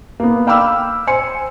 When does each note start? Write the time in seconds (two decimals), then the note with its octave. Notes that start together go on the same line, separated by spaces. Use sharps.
0.20 A#3 B3
0.47 F5 G5 B5 D6 E6 F6
1.07 C5 G#5 C6 C#7